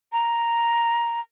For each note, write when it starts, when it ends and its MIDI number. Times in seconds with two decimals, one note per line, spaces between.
0.12 1.20 82